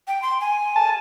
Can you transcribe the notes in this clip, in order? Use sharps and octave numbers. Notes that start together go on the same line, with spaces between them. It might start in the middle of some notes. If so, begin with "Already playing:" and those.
G5
C6
G#5
A5